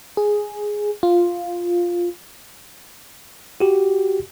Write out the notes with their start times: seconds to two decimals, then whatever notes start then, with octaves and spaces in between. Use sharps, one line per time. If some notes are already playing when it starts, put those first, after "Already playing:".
0.17 G#4
1.03 F4
3.60 F#4 G4